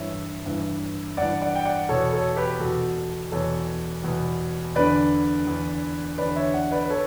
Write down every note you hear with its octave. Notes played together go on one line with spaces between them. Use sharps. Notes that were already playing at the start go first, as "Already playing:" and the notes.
Already playing: G2 E3 C#5 E5
G2 E3
G2 E3 D5 F#5
D5 F#5
G5
D5 F#5
E2 B2 A4 C#5
A4 C#5
G4 B4
E2 B2 F#4 A4
E2 B2 A4 C#5
E2 B2
E2 D3 B4 D5
E2 D3
E2 D3 B4 D5
C#5 E5
D5 F#5
B4 D5
B4
A4 C#5